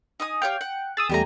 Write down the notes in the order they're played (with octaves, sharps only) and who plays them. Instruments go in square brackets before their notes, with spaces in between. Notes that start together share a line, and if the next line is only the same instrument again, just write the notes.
[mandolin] D#4 G#5 D#6
[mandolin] G4 C#5 F5 [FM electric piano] G5
[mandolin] F#5
[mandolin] G#4 [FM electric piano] D#6 E6 A6
[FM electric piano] E2 G3 A3 [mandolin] G4 G#5 A#5